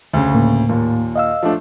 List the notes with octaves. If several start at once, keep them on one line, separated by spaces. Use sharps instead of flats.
D2 C#3
A2 A#3
D#2 A#2
D#5 F5 E6
F3 A3 D4